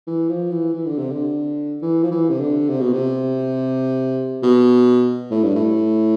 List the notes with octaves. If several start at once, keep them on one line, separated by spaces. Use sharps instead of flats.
E3
F3
E3
E3
D3
C3
D3
E3
F3
E3
C3
D3
C3
B2
C3
B2
A2
G2
A2